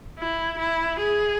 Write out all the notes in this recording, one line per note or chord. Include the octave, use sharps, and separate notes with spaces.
E4
E4
G#4